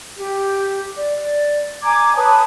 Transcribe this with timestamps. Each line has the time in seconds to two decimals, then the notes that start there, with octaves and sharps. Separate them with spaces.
0.16 G4
0.97 D5
1.83 G#5 A#5 D6 G#6
2.16 B4 C#5 A5 D#6